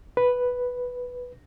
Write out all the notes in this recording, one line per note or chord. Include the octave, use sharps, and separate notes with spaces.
B4